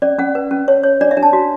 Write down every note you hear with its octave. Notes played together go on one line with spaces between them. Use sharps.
C#4 D5
C#4 F#5
B4
C#4
C#5
C#5
D4 D5
E5
D4
A5
F#4